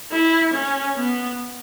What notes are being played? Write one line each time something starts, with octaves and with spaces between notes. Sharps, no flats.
E4
C#4
B3